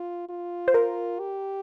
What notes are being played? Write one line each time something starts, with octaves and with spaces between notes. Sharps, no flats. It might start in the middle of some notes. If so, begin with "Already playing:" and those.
Already playing: F4
F4
C5
A#4
G4